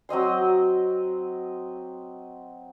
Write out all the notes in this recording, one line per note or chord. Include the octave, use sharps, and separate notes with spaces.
F#3 C4 D#5 C6